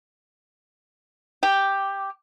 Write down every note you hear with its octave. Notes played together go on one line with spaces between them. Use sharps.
G4